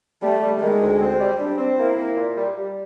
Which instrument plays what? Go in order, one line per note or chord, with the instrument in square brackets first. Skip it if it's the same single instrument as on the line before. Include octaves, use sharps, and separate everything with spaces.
[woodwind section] G3 [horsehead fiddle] A3
[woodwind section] G3
[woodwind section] D#3 [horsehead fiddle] G#3
[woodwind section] D2
C4
G3
[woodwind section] G3 [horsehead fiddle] D4
[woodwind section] C4
[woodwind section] A#3 [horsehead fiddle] E4
[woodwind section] A#3
A#2
G3
G3